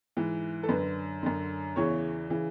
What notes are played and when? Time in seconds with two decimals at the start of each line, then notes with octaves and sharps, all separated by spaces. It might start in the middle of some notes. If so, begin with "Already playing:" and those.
0.17 G#2 E3
0.63 A4
0.69 F#2 D3 B4
1.23 F#2 D3
1.76 E2 C#3 E3 C#5
2.30 C#3 E3